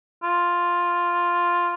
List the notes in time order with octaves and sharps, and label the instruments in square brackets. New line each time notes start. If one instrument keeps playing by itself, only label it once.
[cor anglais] F4